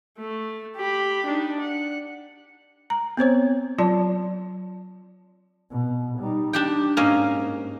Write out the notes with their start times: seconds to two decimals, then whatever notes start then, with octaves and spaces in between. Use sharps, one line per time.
0.19 A3
0.77 G4 B5
1.26 D4 D#4
1.60 F#5
2.90 A#5
3.17 B3 C4 C5 C#5
3.78 F#3 F4 D5 A5
5.71 B2
6.19 G3 D#4
6.53 D4 G4 G5
6.97 G#2 A#3 C#4 D#5